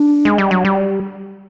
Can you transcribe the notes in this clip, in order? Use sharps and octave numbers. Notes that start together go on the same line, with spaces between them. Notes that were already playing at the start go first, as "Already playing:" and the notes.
Already playing: D4
G#3
G3
F#3
G3